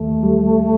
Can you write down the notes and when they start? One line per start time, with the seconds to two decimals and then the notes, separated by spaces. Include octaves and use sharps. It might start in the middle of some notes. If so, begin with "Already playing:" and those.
Already playing: D#2 A3
0.23 G3